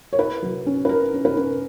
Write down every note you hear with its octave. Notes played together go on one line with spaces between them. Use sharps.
C#5
E4 B4
F#3
C#4
B4
E4 A#4
C#4
B4
C#4